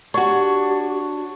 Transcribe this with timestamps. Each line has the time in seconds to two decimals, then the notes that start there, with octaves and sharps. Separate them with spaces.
0.14 D4 F#4 G4 C#5